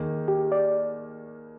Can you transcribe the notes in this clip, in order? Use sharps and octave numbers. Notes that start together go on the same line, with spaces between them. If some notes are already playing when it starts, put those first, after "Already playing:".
Already playing: D#2 D#3 A#3 D#4 G#4
G4
D5